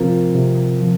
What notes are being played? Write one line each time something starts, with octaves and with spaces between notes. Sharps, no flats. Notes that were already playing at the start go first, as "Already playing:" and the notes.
Already playing: C3 F3 C4 F4 A#4
C3
F3